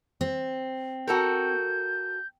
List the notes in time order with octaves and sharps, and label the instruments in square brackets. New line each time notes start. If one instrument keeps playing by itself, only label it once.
[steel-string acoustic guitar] C4
[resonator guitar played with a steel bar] F#4 A4 A#4 [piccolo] G6